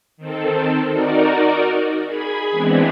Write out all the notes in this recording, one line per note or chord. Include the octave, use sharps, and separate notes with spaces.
D#3 C4 A4
D#4 F#4 A#4 D5
G#4 B5 G#6
E3 G#3 B3 C4 D4